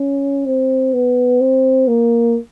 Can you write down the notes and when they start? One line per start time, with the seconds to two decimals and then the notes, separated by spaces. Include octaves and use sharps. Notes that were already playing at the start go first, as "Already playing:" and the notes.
Already playing: C#4
0.46 C4
0.94 B3
1.41 C4
1.88 A#3